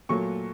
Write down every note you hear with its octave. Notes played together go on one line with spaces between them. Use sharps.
A#2 F#3 A3 C#6